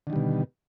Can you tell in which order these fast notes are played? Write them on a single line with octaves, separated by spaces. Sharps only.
D3 D#3 G3 B2